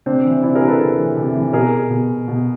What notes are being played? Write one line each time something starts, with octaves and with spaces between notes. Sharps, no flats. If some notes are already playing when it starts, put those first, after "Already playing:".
C3 C4 D4
E3
C3 D4 E4
G#4 A#4
E3
A4 B4
C3
E3
C3
E3
B2 G#4 A#4
B2
B2